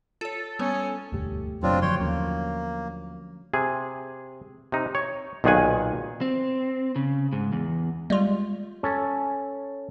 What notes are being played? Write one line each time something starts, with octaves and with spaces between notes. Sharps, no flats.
F4 A4 C#5
G3 B3 C#4 C#5
E1 D2 G2 A3 G4
F#1 B2 F#3 C4 D4 F4 C#5 D5
D3 F3 C#5 G5 C6
D#2 A#3 C#4
C3 G#4
C3 D#4
C#5
B1 A#2 D#3 G#4 F#5 G#5
C4
C#3
G#2
E2
G3 G#3 F4
C#4 A4